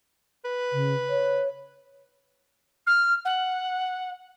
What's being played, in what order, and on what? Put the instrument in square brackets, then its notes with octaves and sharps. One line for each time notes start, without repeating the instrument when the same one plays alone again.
[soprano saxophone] B4
[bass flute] C#3
C#5
[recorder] F6
F#5